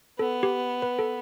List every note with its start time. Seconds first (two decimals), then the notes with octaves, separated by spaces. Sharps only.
0.19 B3 A4
0.43 G4
0.82 B4
0.99 A4